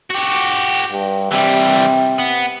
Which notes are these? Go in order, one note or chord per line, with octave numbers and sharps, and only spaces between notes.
F#4 G4
G2
C3 E3 G3
B3